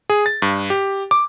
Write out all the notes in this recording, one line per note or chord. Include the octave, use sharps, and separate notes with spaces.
G#4
A6
G2
G4
D6